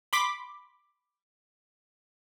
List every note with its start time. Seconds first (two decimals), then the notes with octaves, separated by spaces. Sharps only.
0.13 B5 C6 D6 B6